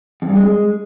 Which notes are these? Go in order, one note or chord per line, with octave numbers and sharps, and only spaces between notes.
F2
G2
G#3